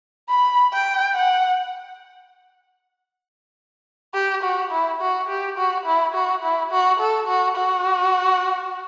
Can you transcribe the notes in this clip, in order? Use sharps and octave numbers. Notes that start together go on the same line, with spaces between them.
B5
G5
F#5
G4
F#4
E4
F#4
G4
F#4
E4
F#4
E4
F#4
A4
F#4
F#4